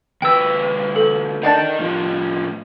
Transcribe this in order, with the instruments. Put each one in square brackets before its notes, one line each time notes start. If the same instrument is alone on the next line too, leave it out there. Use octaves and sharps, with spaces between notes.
[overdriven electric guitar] D2 B4 [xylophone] G5 E6
[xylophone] A4
[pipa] B2 D4 A5 [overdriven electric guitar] D#4 A#4
[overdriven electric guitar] A2 F3